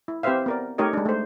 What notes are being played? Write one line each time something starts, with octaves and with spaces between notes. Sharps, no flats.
E4
C4 G4 B4 C5 E5 F5
B3 A#4 D5
A3 D#4 G4 A#4 C#5 D#5
G#3 D4
A3 C5